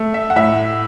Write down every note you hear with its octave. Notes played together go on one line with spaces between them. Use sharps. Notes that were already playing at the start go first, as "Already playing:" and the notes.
Already playing: A3
E5
F#5
A2 E5